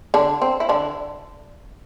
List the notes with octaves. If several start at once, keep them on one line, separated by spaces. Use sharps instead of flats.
D3 D4
C4
E4
D3 D4